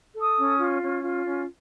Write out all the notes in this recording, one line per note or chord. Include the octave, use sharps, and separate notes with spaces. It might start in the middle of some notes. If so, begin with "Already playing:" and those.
A4
D#6
C#4
F4
C#4
F4
C#4